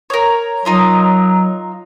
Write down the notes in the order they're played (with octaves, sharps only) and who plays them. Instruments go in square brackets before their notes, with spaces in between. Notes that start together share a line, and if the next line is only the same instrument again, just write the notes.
[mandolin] A#4 C#5
[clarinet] F#3 [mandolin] D#4 F4 A#4